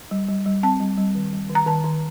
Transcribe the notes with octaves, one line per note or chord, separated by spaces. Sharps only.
G3
G3
G3
C4 A5
G3
G3
D#3
G3
D#3
A#5
D#3 A5
D#3